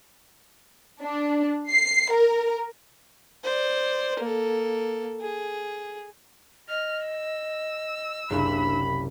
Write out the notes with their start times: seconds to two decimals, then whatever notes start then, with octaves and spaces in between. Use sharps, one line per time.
1.02 D4
1.69 C7
2.12 A#4
3.44 C5 D5
4.19 A#3 A4
5.21 G#4
6.69 D#5 F6
7.06 E6
8.30 F#1 C2 D4 B5